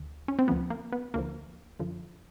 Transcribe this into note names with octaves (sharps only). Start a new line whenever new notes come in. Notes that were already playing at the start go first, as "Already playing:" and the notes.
Already playing: D2 D3
C#4
C4
D2 D3 F3 B3
A#3
B3
D2 D3 F3 A#3
F#2 D3 F3